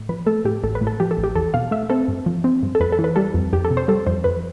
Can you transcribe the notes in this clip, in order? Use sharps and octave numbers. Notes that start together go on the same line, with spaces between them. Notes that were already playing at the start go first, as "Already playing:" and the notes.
Already playing: A2
F3 B4
A3 A4
A2 G4
A1 A4
B4
A2
A4
F3 G4
A4
A1
G4
E2 A4
B2 F5
A3 E5
C4 A4
G2
F3
C4
G2
A4
F2 B4
A4
E3
B4
G3 A4
F2
F2 G4
A4
C3
C5
G3 A4
F2 C5
F2 B4